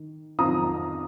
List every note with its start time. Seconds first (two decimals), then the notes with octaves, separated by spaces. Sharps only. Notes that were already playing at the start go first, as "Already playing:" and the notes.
Already playing: D#3
0.39 F2 D#3 C4 F4 A#5 D#6